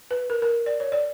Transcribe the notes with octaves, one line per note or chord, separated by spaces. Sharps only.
B4
A#4
A#4
D5
C#5
D5